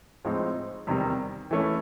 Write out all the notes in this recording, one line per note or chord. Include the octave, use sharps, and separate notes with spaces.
A2 F3 G#3 C4 D#4
E2 C3 D#3 G3
E3 A3 C#4